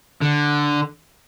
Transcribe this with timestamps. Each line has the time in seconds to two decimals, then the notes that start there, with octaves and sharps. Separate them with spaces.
0.21 D3